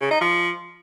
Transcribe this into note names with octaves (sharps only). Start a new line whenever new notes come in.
C#3
D#4
F3